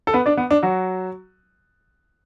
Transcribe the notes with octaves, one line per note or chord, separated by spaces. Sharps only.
A4
B3 B4
D4 D5
B3
D4
F#3 F#4